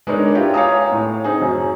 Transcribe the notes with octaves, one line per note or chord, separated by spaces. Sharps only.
G#3 B3 D4 D#4 A#4 C#5
E4 F4 G4 C#5
C#5 F5 G#5 A#5 D#6
A2
C4 D#4 G#4
F#2